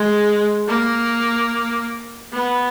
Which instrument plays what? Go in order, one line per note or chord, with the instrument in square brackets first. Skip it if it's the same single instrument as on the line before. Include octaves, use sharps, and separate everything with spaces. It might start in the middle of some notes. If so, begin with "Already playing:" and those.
Already playing: [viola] G#3
A#3
B3